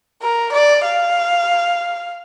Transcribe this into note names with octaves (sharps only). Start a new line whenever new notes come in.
A#4
D5
F5